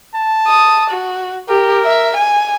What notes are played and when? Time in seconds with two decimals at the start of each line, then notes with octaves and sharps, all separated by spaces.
0.14 A5
0.48 D#6
0.90 F#4
1.49 G4 A#4
1.85 E5
2.16 G#5